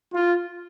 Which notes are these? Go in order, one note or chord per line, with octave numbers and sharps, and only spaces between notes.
F4